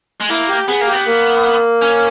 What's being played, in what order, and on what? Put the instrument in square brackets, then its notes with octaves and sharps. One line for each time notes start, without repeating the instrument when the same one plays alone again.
[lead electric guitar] G#3
[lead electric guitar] A#3 [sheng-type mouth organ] E4
[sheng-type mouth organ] G4
[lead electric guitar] B3 [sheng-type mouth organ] G#4
[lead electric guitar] A#3
[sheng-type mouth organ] G4
[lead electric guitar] B3
[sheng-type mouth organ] A#3
[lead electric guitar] C#4